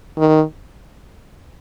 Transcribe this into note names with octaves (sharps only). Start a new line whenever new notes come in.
D#3